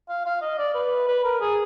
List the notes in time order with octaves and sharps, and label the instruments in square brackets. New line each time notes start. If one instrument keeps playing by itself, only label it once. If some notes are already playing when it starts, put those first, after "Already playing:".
[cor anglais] F5
F5
D#5
D5
B4
B4
A#4
G#4